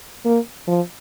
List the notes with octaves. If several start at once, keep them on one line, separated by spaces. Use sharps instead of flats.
A#3
F3